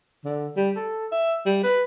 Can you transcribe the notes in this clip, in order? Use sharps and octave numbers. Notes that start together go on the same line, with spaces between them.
D3
G3
A4
E5
G3
B4